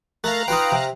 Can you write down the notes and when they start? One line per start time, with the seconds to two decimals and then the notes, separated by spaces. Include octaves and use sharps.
0.24 A3 A#4 F5 A#5 F#6 A6
0.48 D#4 F4 B4 G5
0.72 C3